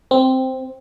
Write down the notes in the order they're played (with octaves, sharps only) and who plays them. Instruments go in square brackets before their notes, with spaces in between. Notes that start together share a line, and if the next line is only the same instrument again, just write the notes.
[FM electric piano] C4